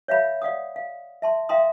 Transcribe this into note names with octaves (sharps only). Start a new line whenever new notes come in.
C#5 E5 F5 B5
D5 F5 F#5 D#6
F5
E5 A5 C6
E5 F5 G5 A#5 C6 D#6